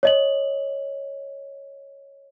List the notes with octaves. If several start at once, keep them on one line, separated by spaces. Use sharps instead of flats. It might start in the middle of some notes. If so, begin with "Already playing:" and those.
C#5 D#5 F#7